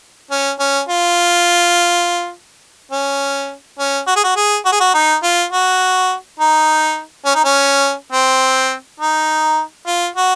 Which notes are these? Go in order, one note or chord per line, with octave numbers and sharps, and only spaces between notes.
C#4
C#4
F4
C#4
C#4
F#4
G#4
F#4
G#4
F#4
G#4
F#4
D#4
F4
F#4
D#4
C#4
D#4
C#4
C4
D#4
F4
F#4